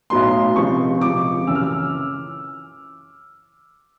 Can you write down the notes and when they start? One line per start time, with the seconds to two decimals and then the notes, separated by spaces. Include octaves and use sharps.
0.10 B1 A2 F#3 B3 C6
0.56 C#2 C3 F3 C#6
1.01 C#2 C3 F3 D6
1.47 F#1 F#2 C#3 E3 E6
1.55 F6
1.63 E6